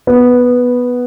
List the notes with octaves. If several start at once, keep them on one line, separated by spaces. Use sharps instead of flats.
B3